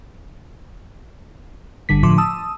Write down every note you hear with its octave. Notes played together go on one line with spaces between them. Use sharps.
G1 D3 G3 B6
A2 D3 F3 C6 D6
A5 D#6 E6